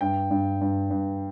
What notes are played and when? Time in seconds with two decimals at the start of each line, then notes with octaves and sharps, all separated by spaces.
0.01 G2 G5
0.31 G2
0.61 G2
0.90 G2